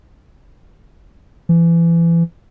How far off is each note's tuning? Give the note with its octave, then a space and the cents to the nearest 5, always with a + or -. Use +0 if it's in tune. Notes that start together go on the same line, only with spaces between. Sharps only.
E3 +30